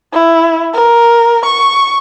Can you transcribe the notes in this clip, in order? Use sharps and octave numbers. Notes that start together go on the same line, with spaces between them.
E4
A#4
C#6